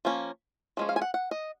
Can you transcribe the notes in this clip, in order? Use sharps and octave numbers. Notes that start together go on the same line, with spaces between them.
F3 A#3 C#4
F3 G#3 C#4
F5
G#5
F#5
F#5
D#5